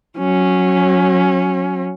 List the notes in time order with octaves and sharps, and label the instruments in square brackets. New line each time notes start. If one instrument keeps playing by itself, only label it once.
[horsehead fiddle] F#3 C#4